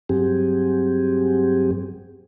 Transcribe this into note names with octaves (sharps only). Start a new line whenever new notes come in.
G2 F#3 C4 G4 G#4